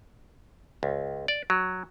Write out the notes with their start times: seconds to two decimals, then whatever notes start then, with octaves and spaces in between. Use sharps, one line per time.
0.83 C#2
1.28 D5
1.50 F#3